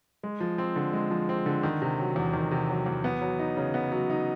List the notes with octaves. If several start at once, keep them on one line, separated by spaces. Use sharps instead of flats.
G#3
F3
C4
D3
G#3
F3
C4
D3
D#3
C3
F#3
E2
D#3
C3
F#3
E2
B3
F#3
D#4
C#3
B3
F#3
D#4